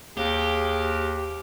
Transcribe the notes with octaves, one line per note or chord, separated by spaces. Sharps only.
D#2 G4 G#4